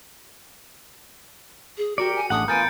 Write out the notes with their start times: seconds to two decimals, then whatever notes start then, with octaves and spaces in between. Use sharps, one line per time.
1.78 G#4
1.98 F#4 G4 A#4 D5 C#7
2.16 G#5
2.30 A1 A3 D4 F#5 D#6
2.48 B3 F4 A#4 G#5 G6 A6 D7